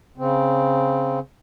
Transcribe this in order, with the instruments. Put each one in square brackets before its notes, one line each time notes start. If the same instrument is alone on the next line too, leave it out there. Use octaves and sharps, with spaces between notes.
[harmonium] C#3 C4